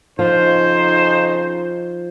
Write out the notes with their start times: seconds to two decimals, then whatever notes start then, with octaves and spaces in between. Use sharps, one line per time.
0.19 F2 C#3 F3 D#4 C5